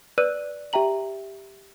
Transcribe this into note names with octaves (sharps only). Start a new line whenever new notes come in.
B4 D5 E6 F#6 D#7
G4 E5 G5 A#5 F#7